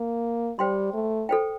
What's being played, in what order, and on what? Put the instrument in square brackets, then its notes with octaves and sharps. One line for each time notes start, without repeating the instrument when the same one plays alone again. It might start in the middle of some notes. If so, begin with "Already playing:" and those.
Already playing: [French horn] A#3
[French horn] G3 [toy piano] C5 G5 C6
[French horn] A3
[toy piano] A4 C5 G5